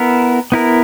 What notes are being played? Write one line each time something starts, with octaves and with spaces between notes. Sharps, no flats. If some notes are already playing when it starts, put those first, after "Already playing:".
Already playing: B3 E4 A#4
B3 E4 A#4